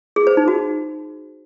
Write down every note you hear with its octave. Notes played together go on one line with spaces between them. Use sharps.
G#4
C5
D#4
F#4